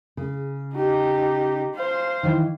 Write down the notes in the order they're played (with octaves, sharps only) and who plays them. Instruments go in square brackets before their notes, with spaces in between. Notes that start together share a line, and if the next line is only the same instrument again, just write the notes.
[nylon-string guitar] C#3
[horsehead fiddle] D#4 G4
C5 F5
[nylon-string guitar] D#3 E3 E5